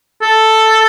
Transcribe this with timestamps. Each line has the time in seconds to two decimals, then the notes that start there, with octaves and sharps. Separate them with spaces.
0.22 A4